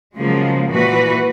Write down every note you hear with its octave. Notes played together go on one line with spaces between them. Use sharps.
C#3 F3 F#3 G#3 A#3
A#2 E3 F#4 B4